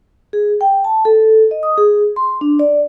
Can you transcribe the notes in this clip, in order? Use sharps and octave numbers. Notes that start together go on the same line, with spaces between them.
G#4
G5
A5
A4
D#5
D#6
G#4
C6
D4
D5